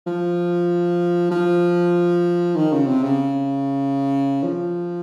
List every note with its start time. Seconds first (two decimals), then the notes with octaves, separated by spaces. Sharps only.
0.06 F3
1.31 F3
2.56 D#3
2.72 C#3
2.87 C3
3.03 C#3
4.43 F3